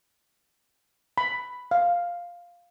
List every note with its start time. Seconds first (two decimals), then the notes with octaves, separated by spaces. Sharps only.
1.18 B5
1.71 F5